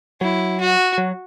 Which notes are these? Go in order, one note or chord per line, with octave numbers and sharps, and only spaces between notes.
F#3 E4
F#4
F#3